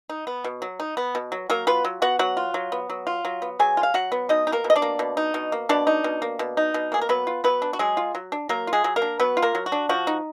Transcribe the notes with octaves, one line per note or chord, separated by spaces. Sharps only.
D#4
B3
B2
F#3
D#4
B3
B2
F#3
F#3 A#3 A#4
B3 F4 B4
F#3
B3 F#4 F#5
F#3 F#4 F#5
F4
F#3
B3
F#3
F4
F#3
B3
F#3 G#4 G#5
F4
F5
F#3 F#4 F#5
B3
B2 D#4 D#5
D#4
A#3 A#4
B2
D#5
D4 D5
A#3
B2
D#4
B2
A#3
B2 D4 D5
D#4
B2
A#3
B2
D#4
B2
A#3 G#4
A#4
F#3 B3 B4
F4
F#3 B3 B4
D4
F#4
F#3 G#3 G#4
F4
F#3
D4
F#3 A#3 A#4
F4
G#3 G#4
F#3
A#3 A#4
D4
F#3 B3 B4
F4
A#3 A#4
F#3
F#4
D4
F3 F#4
D#4